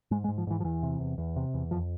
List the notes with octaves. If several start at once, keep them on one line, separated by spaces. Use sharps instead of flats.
G#2 G#3
G#3
G#2
F3
G#2 E3
F3
E2 E3
C3
E2
E2
C3
E2
F2 F3